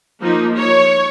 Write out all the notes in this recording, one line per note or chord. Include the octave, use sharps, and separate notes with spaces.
F3 A#3 D#4
C#5